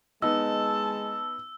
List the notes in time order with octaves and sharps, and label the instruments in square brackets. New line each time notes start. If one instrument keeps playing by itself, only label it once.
[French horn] G#3 [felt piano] B3 D#4 [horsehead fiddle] A5 [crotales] E6